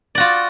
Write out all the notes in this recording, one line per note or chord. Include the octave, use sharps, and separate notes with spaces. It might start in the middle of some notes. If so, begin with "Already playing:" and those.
F4 F#4 D5